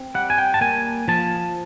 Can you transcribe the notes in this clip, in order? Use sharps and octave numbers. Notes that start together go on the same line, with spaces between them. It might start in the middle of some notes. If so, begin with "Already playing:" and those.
Already playing: C4
G3 F#5
G#5
G5
A5
A#3 G#5
F3 A5